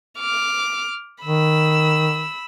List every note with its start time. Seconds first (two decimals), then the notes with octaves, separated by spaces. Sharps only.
0.19 D6 F6
1.24 D#3 B5 E6